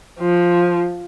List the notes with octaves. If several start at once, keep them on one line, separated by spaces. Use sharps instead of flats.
F3